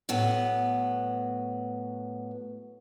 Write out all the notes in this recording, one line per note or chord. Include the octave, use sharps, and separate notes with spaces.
A2 F#3 B3